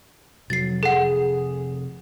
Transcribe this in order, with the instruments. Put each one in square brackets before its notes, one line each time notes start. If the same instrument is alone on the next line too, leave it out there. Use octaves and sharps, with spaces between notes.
[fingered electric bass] C3 F3 [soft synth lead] F#3 [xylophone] A6 C7
[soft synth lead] G#4 [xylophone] A4 F#5